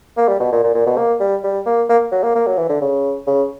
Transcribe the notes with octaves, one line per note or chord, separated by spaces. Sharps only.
A#3
G3
B2
A#2
A#2
A#2
B2
A#3
G3
G3
A#3
A#3
F#3
A#3
A#3
F#3
E3
D3
C#3
C#3